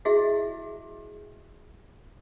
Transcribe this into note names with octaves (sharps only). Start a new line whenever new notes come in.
E4 F#4 G#4 D#5 E5